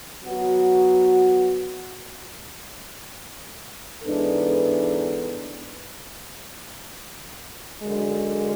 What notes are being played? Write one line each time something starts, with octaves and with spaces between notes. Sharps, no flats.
F#3 B3 F#4
G#2 E3 B3 D4 A4
F#2 D3 G#3